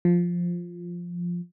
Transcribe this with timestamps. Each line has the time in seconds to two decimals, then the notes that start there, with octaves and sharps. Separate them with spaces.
0.05 F3